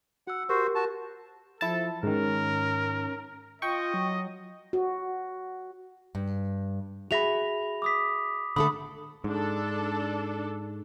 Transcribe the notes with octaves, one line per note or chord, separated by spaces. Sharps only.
F#4 F#5 E6
F#4 G4 A#4 C5 C#6
F#4 A5
F3 E4 A4 A5
G#2 D#3 C#4 A#4
F4 D#5 G5 C#6
F#3
F#4
G2
F#4 G#4 E5 B5 A#6 F7
D6 D#6 B6
D3 A3 A4 B5 D#6
G#2 D4 A4